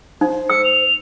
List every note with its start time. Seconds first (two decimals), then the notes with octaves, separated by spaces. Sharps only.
0.21 D#4 C5
0.50 E6 C#7
0.64 F7